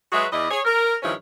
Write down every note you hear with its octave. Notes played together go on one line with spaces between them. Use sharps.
F#3 G#3 F#4 G#4 B4 E5
E2 E4 D5 D#5
G#4 C#5
A#4
G2 D#3 F3 C#4 E4 C#5